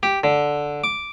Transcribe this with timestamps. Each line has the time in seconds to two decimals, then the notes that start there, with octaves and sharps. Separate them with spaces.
0.03 G4
0.24 D3
0.84 D6